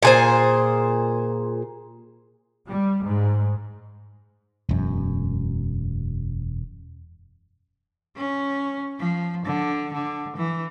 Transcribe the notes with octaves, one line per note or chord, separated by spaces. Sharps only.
A#2 G#4 C5
G3
G#2
E1 F#2
C#4
F3
D3
D3
E3